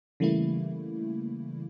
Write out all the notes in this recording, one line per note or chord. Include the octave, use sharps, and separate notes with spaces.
C#3 E3 G3 A3 A#3 E4